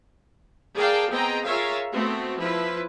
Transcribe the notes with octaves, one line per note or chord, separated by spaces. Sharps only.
G#4 A#4 D5 F5 G5 A5
B3 C4 G#4 D#5 G5 A#5
F4 G#4 A#4 C#5 E5 F5
A3 B3 C4 F#4
F3 E4 B4